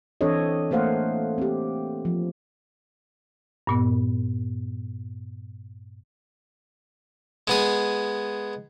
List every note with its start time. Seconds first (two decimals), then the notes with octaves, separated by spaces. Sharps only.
0.21 E3 C4 D4 A4 C#5 D#5
0.71 A3 A#3 C5 F5 F#5
1.38 C4 G4
2.05 F3
3.67 G2 A#2 B3
7.47 G#3 B3 G#4